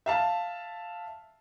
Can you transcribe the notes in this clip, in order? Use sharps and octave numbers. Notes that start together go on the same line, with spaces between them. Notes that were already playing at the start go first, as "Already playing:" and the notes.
E5 F5 A5